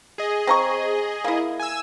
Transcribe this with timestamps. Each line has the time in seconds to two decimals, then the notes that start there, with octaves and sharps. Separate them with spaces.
0.18 G#4 D#5
0.47 C4 A#5 C#6
1.24 A#3 E4
1.60 G#5 E6